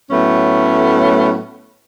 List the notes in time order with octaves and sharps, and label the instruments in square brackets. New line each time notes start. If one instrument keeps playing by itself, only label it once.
[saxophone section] A2 F#3 A3 B3 C#4